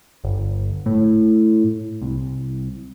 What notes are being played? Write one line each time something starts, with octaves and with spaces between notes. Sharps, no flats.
G1
A2
C2